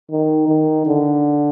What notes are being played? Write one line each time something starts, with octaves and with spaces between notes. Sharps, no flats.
D#3
D#3
D3